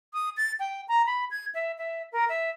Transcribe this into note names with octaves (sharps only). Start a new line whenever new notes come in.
D#6
A6
G5
A#5
B5
G#6
E5
E5
A#4
E5